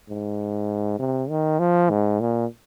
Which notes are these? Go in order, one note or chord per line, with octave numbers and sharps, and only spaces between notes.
G#2
C3
D#3
F3
G#2
A#2